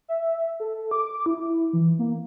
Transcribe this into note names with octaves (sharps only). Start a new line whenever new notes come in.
E5
A4
D6
E4
E3
A#3